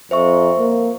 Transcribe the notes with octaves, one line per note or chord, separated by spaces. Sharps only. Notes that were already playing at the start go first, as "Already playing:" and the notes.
F2 C5 E5 C#6
A#3